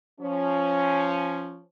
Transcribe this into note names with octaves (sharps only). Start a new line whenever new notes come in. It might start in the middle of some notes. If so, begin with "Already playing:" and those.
F3 C#4